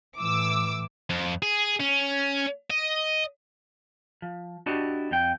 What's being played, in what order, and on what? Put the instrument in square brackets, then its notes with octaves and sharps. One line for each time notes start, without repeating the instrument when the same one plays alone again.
[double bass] A2 E3 [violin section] D6 E6
[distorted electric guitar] F2
G#4
C#4
D#5
[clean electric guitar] F3
D4 E4 F#4 G4 D5 D#5
F2 G5